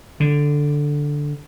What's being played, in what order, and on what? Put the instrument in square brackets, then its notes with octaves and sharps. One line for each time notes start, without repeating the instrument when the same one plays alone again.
[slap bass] D3